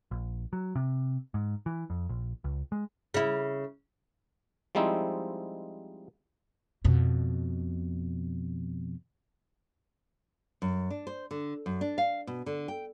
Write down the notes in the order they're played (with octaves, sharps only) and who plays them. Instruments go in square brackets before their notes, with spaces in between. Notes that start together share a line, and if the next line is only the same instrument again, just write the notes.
[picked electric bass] A#1
F#3
C3
G#2
E3
F2
A#1
C#2
G#3
[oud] C#3 E4
[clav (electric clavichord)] F3 G3 G#3 C4 D#4 E4
[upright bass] F2 B2
[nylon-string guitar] F#2
D4
C5
D3
F#2
D4
F5
B2
D3
G5